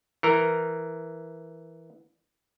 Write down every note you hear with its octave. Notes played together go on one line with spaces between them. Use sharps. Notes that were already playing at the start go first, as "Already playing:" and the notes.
E3 A#4 A#5